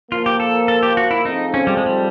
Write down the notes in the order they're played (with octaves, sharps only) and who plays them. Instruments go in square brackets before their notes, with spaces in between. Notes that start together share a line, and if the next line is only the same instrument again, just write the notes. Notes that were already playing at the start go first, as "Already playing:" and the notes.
[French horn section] A#2 F3 A#3 [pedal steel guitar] F4
[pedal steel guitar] G4
A4
A4
G4
F#4
E4
[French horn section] G#2 F3 A3 C4 F4 [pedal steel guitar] D#4
[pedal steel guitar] C#4
G3
G#3
G3